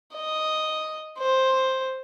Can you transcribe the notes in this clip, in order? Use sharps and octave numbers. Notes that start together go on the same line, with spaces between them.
D#5
C5